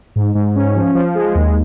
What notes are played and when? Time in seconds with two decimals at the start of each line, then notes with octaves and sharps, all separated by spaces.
0.16 G#2
0.35 G#2
0.56 C#4
0.76 F3
0.95 F3
1.15 G#3
1.35 D#2